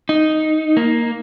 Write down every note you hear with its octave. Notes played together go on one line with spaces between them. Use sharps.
D#4
A#3